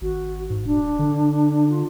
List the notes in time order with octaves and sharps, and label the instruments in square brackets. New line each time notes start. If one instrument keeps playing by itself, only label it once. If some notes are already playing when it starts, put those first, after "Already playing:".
[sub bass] G#1 [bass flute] F#4
[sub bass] G#2
[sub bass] D#1 [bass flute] D4
[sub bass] D3
[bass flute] F4